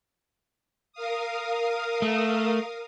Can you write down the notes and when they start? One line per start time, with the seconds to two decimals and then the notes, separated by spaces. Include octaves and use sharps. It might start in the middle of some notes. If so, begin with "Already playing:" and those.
0.93 A#4 F5 D#6
2.02 A3